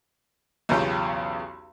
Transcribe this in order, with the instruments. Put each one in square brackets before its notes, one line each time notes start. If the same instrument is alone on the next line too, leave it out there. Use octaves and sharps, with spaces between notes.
[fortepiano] B1 E2 C#3 F4 G4 G5